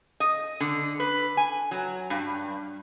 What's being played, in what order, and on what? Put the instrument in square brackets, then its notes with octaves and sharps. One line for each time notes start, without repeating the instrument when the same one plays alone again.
[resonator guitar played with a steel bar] D#5
D3
B4
G#5
F#3
G2